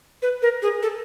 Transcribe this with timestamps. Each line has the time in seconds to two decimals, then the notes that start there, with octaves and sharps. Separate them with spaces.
0.22 B4
0.42 A#4
0.62 G#4
0.83 A4